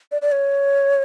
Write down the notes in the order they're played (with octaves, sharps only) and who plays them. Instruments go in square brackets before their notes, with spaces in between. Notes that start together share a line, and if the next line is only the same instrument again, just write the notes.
[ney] D5
D5
C#5